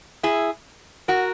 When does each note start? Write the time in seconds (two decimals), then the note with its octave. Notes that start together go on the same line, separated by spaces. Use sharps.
0.23 E4 G#4
1.08 F#4 A#4